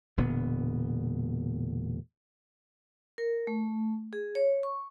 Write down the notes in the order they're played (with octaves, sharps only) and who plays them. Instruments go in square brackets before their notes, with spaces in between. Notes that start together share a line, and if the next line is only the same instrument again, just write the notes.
[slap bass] E1 A#2 D3 B3
[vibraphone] A#4
A3
G#4
C#5
C#6